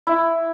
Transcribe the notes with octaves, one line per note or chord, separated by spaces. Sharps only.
E4